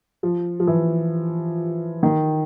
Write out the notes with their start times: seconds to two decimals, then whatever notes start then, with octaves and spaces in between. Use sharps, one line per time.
0.23 F3
0.60 F3
0.67 E3
2.03 D#3